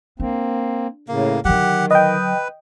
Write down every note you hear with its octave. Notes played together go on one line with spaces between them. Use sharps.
A#3 C4 D4
A2 C#3 A#3
D3 D#3 F#3 G4 F#5
B4 D#5 G5